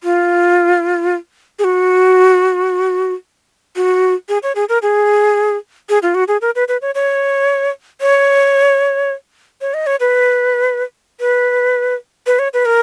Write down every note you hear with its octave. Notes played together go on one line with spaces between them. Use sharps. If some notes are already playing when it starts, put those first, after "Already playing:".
F4
G#4
F#4
F#4
G#4
C#5
G#4
A#4
G#4
G#4
F4
F#4
G#4
A#4
B4
B4
C#5
C#5
C#5
C#5
D#5
C#5
B4
B4
B4
C#5
B4
A#4